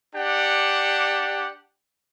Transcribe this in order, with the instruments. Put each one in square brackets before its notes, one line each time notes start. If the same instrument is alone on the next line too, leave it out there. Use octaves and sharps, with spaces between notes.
[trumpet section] D4 G4 F#5